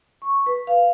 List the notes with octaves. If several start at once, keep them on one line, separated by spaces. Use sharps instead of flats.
C#6
B4
F5